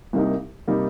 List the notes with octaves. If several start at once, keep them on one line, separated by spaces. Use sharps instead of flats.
C2 C3 G3 A#3 D#4
C3 G3 A#3 D#4